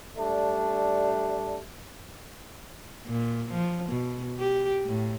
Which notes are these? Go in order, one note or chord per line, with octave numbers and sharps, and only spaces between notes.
G3 A3 D4
A#2
F3
B2
G4
A2